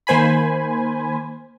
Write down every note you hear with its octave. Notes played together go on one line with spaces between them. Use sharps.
D#3 A#3 C5 G#5 B5